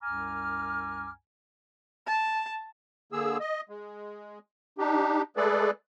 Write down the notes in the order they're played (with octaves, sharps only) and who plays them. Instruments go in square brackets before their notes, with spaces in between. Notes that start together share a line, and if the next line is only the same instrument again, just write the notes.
[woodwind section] C2 F#2 G#5 A#5 D6 F6
[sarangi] A5
[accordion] D3 A#3 G#4 E6
D#5
G#3
D4 D#4 G4
G#3 A3 G#4 A4 B4 D5